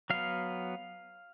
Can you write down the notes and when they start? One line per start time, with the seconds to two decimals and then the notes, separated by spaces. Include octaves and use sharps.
0.10 F#3 B3 F5